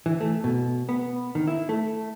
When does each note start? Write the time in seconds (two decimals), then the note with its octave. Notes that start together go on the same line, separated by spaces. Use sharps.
0.06 E3
0.21 A3
0.44 B2
0.89 B3
1.35 D#3
1.47 E4
1.69 A3